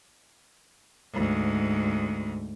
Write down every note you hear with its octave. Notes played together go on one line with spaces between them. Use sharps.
D2 G#2